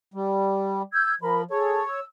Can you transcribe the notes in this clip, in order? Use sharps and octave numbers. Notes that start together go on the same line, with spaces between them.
G3
E6 G6 G#6
F3 A#4 B5
G#4 A4 C#5
E6